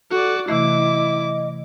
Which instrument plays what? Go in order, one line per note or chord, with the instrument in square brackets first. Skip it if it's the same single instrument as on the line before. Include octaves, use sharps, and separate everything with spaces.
[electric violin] F#4 D5 [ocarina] A4
[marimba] C3 E3 A3 [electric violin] E4 D6 [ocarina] D#5